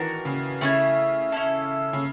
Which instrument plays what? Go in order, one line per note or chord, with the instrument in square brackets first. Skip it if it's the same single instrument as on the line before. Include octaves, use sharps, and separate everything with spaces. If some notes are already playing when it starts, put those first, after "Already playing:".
Already playing: [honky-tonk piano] D#3 E3 [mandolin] D4 F#4 A#4
[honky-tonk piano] C#3
[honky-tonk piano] C#3 [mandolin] A3 C#4 E4
[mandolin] C#4 E4 A4
[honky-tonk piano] C#3